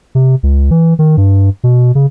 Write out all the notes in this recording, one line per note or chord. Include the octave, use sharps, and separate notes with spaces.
C3
C#2
E3
D#3
G2
B2
C#3